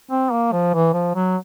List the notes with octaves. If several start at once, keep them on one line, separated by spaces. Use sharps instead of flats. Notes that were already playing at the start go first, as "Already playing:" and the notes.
C4
A#3
F3
E3
F3
F#3